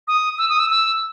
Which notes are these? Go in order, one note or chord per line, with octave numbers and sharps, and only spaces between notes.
D#6
E6
D#6
E6
E6